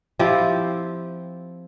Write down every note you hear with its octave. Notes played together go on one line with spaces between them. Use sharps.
F3 C4 E4 G4